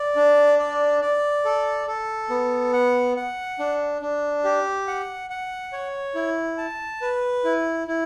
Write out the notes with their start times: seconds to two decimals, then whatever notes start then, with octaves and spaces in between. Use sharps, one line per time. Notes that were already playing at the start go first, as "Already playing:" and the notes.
Already playing: D5
0.16 D4
0.59 D5
1.01 D5
1.45 A4
1.87 A4
2.30 B3
2.73 F#5
3.16 F#5
3.59 D4
4.02 D4
4.44 G4
4.88 F#5
5.30 F#5
5.73 C#5
6.15 E4
6.58 A5
7.02 B4
7.44 E4
7.87 E4